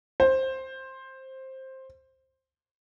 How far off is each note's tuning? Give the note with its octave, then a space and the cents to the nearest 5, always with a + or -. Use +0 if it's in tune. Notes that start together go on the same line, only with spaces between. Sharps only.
C5 +10